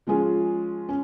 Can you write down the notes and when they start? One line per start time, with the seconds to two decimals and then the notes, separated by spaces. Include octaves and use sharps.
0.07 F3 G#3 C#4 F4 G#4
0.89 C#4